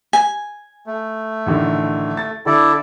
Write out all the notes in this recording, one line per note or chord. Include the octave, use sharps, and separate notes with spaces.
G#5
A3
A1 D3 D#3
A6
D3 E4 A4 D5